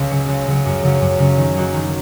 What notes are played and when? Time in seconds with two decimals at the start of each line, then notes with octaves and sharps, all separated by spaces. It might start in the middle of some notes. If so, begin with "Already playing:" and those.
Already playing: C#2 C#4
0.10 C#3 F#3
0.28 C#2
0.47 C#3 F#3
0.65 F#2
0.83 C#3 F#3 C#4
1.01 F#2
1.19 C#3 F#3 C#4
1.37 D#3
1.56 F#3 A#3 D#4 F#4
1.74 D#3